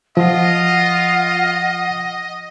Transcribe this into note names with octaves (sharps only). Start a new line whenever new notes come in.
F3 F4 D#5 F#5